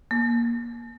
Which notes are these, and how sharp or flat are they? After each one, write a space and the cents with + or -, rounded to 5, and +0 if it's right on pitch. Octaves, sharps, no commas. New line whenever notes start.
A#3 +15